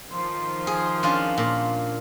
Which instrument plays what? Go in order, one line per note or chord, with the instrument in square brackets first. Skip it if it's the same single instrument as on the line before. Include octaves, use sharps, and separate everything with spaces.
[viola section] D#3 F3 C6
[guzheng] G#4
C#4 D4 F4
A#2